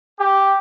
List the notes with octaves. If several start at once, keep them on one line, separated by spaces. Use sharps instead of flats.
G4